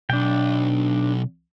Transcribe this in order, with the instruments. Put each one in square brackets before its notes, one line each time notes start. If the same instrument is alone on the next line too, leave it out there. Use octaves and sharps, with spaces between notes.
[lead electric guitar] B1 [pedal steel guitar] D4 G5